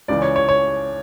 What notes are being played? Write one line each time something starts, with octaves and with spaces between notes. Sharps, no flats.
C#2 C#3 E3 D5
C#5
C#5
C#5